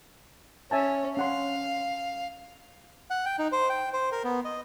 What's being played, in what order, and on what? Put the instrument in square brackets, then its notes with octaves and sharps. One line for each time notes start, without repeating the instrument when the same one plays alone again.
[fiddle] C#4 [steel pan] E5 G#5 A5
[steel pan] C#4 F#5 C6 [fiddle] F5
[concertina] F#5
G5
D#4
C5
G5
C5
A#4
B3
D#5